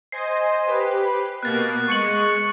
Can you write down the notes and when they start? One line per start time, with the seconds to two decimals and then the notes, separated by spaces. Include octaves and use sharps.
0.12 C5 D#5 G#5 C7
0.67 G4 B4
1.43 B2 A#3 B3 F#6 A6
1.88 G#3 C#6 C#7 F#7